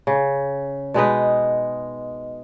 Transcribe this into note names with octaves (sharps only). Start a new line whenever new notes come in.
C#3
B2 G#3 D#4 B4